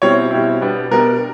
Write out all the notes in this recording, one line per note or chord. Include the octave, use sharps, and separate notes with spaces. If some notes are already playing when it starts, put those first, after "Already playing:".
B2 G3 C4 E4 C#5
B2 G3 C4 E4
B2 G3 B3 D4
B2 G3 B3 D4 A#4